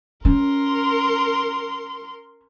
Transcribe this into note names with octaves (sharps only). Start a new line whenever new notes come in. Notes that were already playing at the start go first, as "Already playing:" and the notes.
C#4 A#4 C6